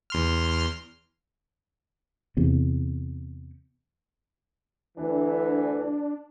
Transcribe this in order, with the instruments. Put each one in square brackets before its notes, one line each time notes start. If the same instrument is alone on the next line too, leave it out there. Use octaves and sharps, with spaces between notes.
[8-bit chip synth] E2 C6 F6
[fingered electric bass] E2 C3
[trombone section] D2 E3 [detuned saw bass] D4